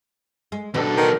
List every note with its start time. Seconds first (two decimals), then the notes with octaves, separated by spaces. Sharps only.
0.52 G#3
0.74 E2 B2 D4 A4
0.98 D#3 A#4